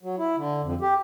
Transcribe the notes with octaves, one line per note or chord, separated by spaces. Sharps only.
F#3
E4
D3
F2
G4